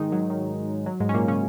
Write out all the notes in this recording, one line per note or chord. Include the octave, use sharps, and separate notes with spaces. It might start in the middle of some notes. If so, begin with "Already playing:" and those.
Already playing: G#2 D#3 G#3 D#4
F#3
D#3
F#3
G#2 G#3
C#4
A#2 A#3
C#3 C#4